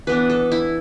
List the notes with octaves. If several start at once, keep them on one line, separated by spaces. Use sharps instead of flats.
E3 B3 D4 B4
A4
E4